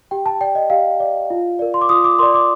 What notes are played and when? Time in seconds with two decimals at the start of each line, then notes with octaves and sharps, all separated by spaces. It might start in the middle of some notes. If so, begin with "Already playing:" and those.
0.11 G4 G5
0.26 A5
0.41 D5 G5
0.55 D#5
0.70 G4 F5
1.00 D5
1.30 F4
1.59 A#4 D5
1.74 C6
1.81 D6
1.89 F4 D#6
2.04 D6
2.19 A#4 D5 C6
2.34 D6